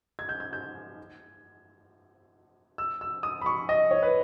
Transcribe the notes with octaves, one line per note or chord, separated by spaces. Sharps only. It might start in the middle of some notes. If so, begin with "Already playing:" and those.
G#6
G6
G#6
G6
E6
E6
D#6
B5
C#6
D#5
C#5
B4